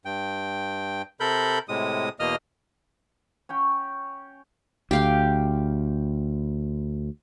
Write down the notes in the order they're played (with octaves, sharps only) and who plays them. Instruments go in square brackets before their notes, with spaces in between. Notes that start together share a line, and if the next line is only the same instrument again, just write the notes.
[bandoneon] G2 G5
C3 A4 A#4 B5 G6
A2 C3 G#3 D#6
E2 B2 A#3 D#5 D#6 F6
[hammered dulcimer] C#4 C#5 G5
[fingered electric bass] D2 [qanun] G4 F5 G5